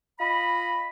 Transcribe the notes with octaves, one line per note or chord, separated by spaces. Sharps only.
F4 D#5 B5